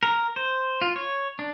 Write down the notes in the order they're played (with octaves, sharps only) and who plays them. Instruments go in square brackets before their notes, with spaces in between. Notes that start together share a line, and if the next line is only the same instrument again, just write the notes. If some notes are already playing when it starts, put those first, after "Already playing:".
[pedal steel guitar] A#4
C5
F4
C#5
D4